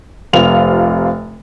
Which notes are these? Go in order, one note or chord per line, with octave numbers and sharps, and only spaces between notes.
F1 C3 F4 F7